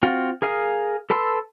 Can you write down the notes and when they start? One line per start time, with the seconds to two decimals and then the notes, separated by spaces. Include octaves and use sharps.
0.03 C4 F4 F#4
0.42 G#4 A#4 F5 D#6
1.10 A4 B4 A5 C6 E6